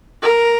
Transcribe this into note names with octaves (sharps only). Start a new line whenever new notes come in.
A#4